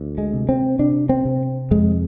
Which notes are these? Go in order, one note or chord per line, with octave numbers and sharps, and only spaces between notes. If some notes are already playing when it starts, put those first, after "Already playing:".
Already playing: D2
G#3
C3
C4
C3 D4
C4
C3
F2 G#3